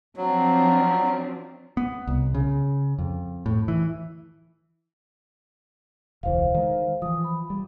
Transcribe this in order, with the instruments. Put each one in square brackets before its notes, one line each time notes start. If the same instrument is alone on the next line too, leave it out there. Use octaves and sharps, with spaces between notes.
[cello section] F3 C4 D4 [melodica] F#3
[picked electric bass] B3
C2
C#3
F2
A2
E3
[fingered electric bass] E1 C#2 E3 [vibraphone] C5 F5
[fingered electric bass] D#3 G#3
[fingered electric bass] E3 F3 [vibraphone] D#6
[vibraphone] B5
[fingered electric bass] G3